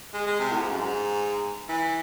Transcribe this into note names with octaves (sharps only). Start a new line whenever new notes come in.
G#3
G#3
C3
A2
G#2
F#2
G#2
E3